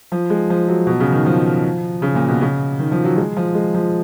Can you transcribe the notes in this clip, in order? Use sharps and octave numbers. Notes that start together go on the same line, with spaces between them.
F3
G#3
F3
F#3
B2
C#3
D#3
F3
C#3
A#2
B2
C#3
D#3
F3
F#3
G#3
F3
G#3
F3